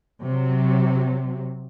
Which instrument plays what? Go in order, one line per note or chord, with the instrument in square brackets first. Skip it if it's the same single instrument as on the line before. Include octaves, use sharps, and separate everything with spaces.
[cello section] C3 F#3